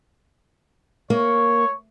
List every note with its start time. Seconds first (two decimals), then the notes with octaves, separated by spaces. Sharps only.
1.10 A#3 C#5 C#6